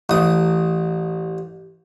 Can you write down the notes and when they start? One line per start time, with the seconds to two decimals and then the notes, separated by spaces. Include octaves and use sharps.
0.10 A1 D#6